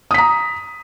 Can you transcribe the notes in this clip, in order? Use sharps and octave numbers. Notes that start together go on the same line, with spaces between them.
A#5 D#6 B6